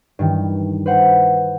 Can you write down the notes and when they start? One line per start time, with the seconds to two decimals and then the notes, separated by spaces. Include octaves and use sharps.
0.19 G2 D#3 E3
0.86 B4 C5 F#5